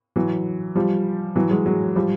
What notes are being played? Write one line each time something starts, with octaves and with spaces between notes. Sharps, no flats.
E3 F#3
F3 G3
E3 F#3
F#3 G#3
F#3 G#3
F3 G3